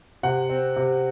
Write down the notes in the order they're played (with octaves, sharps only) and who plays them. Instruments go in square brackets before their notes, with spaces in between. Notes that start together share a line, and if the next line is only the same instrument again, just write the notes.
[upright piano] C3 F#5
C4
C3